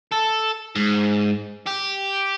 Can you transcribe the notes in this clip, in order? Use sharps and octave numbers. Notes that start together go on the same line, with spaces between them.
A4
G#2
G4